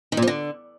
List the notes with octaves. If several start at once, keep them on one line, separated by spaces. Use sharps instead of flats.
D#3
A#2
F3
D3